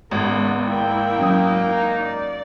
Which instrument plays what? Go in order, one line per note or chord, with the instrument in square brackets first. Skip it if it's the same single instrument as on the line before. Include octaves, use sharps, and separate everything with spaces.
[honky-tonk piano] G#1 [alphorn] C#3 [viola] B3
[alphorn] A#3 [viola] E4 G5
[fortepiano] F#2 F#3 D#6
[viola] D#4
D5